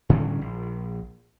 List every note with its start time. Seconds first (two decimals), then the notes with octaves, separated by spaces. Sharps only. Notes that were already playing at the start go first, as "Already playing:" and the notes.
0.09 A2 D3 G3 C#4
0.41 A#1